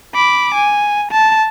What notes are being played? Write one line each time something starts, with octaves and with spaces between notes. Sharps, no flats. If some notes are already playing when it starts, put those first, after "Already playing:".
B5 D6
G#5
A5